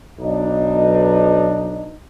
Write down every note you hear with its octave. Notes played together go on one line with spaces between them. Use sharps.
B1 D4 D#4